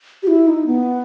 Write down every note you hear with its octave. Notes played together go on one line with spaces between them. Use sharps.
G4
E4
D#4
B3